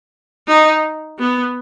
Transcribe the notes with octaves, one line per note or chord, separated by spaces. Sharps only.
D#4
B3